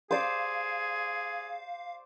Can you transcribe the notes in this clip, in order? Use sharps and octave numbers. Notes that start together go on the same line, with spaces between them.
G#4 C5 D5 F5